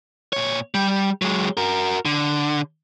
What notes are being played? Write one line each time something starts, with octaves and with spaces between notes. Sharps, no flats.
A#2 C#5
G3
F#3 G#3
F#4 A#4
D3